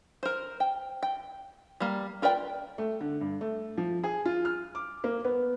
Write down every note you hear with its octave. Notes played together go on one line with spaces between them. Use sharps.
A#4 C5
G5
G5
G3 A#3
F4 A#4 B4 D5 G5
A3
D3
G2
A3
F3
G#4
F4
F6
D6
A#3
B3